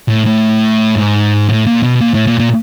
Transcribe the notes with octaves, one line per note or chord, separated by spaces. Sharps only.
A2
A2
G#2
A2
A#2
B2
A#2
A2
A#2
A#2